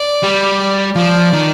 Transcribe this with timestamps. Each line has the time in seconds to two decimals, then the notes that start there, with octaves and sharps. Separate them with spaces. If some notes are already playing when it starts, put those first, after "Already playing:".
Already playing: D5
0.23 G3
0.96 F3 D5
1.33 D#3